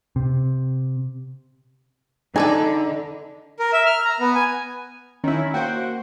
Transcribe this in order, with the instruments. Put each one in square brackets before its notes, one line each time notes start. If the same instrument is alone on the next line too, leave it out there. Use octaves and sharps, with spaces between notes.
[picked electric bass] C3
[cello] D3 [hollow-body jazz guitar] D4 G#4 A4 [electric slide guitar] D#4 [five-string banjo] B4 D5 G#5
[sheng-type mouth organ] A#4
E5
F6
A#5
B3
G#5
[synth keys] D#3 E4 [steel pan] C#4
[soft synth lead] A#3 [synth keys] F#4 C5 [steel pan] G5